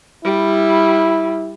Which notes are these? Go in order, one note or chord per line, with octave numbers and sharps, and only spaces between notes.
G3 E4